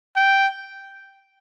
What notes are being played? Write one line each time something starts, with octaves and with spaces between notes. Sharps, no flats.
G5